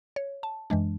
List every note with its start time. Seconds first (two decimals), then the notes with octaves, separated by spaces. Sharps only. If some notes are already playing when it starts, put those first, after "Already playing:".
0.16 C#5
0.43 A5
0.70 F#2 E3 G#3 D4